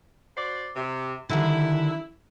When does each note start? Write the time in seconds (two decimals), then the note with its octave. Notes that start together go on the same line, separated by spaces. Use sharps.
0.37 F#4 C5 D5
0.75 C3
1.29 D3 D#3 G3 E4